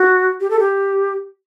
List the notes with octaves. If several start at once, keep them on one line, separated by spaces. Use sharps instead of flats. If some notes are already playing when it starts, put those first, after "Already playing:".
Already playing: F#4
G4
A4
G4